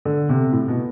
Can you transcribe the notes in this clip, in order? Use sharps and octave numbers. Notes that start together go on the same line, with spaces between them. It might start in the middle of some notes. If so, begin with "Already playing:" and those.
D3
C3
A2
B2